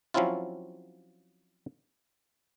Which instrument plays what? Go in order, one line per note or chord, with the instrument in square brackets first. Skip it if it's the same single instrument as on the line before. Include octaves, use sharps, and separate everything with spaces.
[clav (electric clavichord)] F3 F#3 C4 C#4 E4 F4